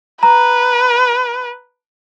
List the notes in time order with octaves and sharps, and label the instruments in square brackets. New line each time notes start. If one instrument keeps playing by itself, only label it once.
[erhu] B4 [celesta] A#5